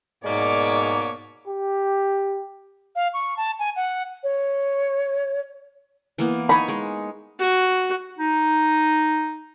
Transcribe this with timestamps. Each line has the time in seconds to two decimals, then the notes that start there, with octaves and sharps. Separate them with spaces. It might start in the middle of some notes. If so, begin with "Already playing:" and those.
0.24 G#2 B2 G#3 A#3 C#5 D5 D6
1.47 G4
2.96 F5
3.14 C#6
3.37 A5
3.59 G#5
3.76 F#5
4.23 C#5
6.18 E3 A#3 B3
6.49 D#4 C#5 G#5 B5
6.68 G#3 C#5
7.39 F#4
8.18 D#4